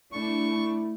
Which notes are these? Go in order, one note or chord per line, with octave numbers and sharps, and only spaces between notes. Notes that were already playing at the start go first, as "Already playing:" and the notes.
A3 D4 E4 C#6